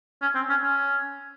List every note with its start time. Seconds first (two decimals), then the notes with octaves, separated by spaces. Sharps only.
0.22 C#4
0.35 C4
0.49 C#4
0.63 C#4